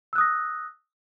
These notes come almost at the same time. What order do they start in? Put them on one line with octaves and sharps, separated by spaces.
E6 F#6 D#6 A#6